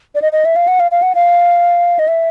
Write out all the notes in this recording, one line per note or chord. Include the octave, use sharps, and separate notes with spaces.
D5
D#5
D#5
E5
F5
F#5
F5
F5
F#5
F5
D#5
E5